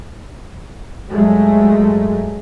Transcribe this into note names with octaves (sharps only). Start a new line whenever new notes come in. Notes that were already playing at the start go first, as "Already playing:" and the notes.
G2 F#3 G#3 A3